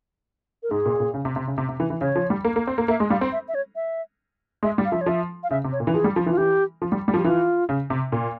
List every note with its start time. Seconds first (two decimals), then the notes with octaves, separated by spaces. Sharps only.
0.63 A#4
0.71 G#2 G#4
0.86 A#2
1.00 A#2
1.14 C#3
1.25 C3
1.36 C3
1.47 C#3
1.58 C3
1.69 C3
1.80 E3
1.90 E3
2.01 C#3 C#5
2.16 F3
2.30 G3
2.45 A#3
2.56 A#3
2.67 C4
2.78 A#3
2.88 A#3 E5
3.00 G#3
3.10 G3 F5
3.21 C4
3.32 E5
3.48 E5
3.55 C#5
3.76 E5
4.63 G#3 E5
4.78 G3
4.85 F5
4.92 F3 E5
5.01 C#5
5.06 F3 E5
5.43 F5
5.51 C#3 E5
5.64 C3
5.72 C#5
5.80 A#2
5.87 E3
5.94 F3 G#4
6.04 G3
6.16 F3
6.26 E3
6.30 F4
6.37 E3 G4
6.82 F3
6.92 G3
7.08 G3
7.14 F3
7.18 G4
7.24 E3 F4
7.69 C#3
7.90 C3
8.12 A#2